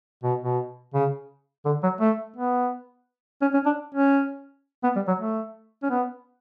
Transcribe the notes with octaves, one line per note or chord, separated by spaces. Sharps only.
B2
B2
C#3
D3
F#3
A3
B3
C#4
C#4
D4
C#4
B3
G3
F#3
A3
C#4
B3